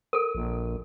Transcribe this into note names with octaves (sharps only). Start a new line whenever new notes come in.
A4 A#4
A#1